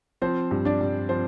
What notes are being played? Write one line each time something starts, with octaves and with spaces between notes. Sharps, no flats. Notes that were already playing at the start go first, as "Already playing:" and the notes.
F3 C4 C5
G2
D4 D5
G2
F3 C4 C5